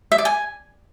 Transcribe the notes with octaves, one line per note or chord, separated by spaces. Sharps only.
E5
D5
G#5